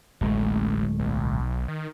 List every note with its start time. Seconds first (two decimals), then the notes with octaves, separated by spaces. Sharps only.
0.21 D1 A1 G#3 A3
1.00 B1
1.68 D#3